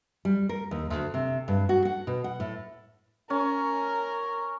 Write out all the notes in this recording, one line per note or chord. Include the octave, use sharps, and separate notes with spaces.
G3
A#4
D#2
D2
C3
G2
F#4
F#5
B2
F#5
A2
C#4 A#4